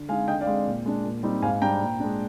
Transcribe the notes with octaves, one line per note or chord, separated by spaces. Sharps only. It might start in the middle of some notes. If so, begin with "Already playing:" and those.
Already playing: D3
G#3 C4 D#4 F5 G#5
D3 D#5 G5
D5 F5
G#3 C4
A#2
G#3 D4
A#2
G3 C4 D#4
G#2 F5 G#5
G3 D4 G5 A#5
A#2
G#3 D4